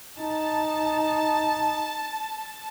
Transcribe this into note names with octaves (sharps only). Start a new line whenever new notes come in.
D#4 A5